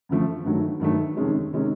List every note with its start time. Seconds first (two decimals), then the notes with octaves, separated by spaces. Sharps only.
0.09 F#2 D3 F3 A3
0.45 G2 D#3 F#3 A3
0.80 G2 D#3 F#3 A3
1.17 F2 C3 D#3 G#3 C#4
1.53 C3 D#3 G#3 C#4